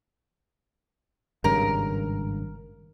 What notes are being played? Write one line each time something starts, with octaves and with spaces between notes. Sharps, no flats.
G#1 G2 C#3 A#4